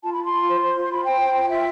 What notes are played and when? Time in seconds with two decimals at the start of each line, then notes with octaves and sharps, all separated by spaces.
0.03 F4 A5
0.13 B5
0.18 F4
0.24 C6
0.33 F4
0.48 C5
0.62 C5
0.76 F4
0.84 C6
0.92 F4 B5
1.06 C5 G5
1.21 C5
1.36 F4
1.50 F4 E5